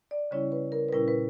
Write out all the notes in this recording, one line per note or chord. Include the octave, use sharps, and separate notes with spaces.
D5
C#3 G3 C#4 E4 C#5
B4
A#4
B4
A#2 G3 C#4 E4 A#4
B4